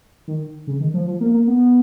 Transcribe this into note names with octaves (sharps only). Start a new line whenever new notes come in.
D#3
C#3
D#3
F3
F3
A#3
A#3
B3